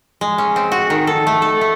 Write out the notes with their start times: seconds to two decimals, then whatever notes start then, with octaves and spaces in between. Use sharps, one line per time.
0.21 G#3
0.38 C#4
0.56 C4
0.72 F#4
0.90 D#3
1.07 A4
1.27 A3
1.42 A4
1.61 A3